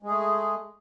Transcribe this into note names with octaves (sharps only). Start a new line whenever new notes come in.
G#3 A3 G#4